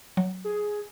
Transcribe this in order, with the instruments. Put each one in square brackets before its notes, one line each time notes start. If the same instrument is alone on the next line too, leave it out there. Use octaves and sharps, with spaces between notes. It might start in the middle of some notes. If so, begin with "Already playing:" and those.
[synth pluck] F#3
[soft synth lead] G#4